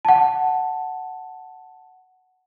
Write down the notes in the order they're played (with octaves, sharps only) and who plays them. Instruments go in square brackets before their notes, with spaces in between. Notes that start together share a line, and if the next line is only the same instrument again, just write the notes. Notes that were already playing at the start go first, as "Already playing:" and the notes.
[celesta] F#5 A5